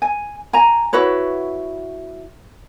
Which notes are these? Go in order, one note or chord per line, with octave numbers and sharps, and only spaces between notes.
G#5
G#5 A#5
E4 F#4 B4 C#5